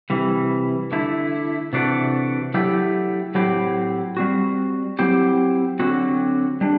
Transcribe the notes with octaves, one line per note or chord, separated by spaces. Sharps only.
C3 E3 G3
D3 A3 E4
C3 E3 A3 D4 F#4
F#3 A3 E4 G4
A2 F#3 C4 E4 G4
G3 C4 F#4
F#3 C4 E4 G4
D3 F#3 C4 F#4
G3 D4